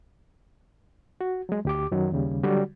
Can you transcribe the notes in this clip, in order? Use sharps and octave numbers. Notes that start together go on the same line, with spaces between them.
F#4
F#3 G#3
D2 G4 D6
F#2 D#3 F#3
D#2 C#3 G3
D3 F#3 G3 F#4